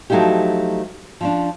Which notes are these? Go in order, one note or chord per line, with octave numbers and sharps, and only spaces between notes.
F3 F#3 A3 D#4 E4 G4
F3 C#4 D4